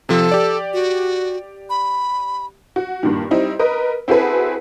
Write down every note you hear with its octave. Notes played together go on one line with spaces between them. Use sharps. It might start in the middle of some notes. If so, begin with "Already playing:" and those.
C3 F3 A4
G4 D5
F#4
B5
F#4
G2 A#2 D#3
G3 C4 D#4 E4
A#4 B4 D#5
C4 E4 F#4 G#4 A4 B4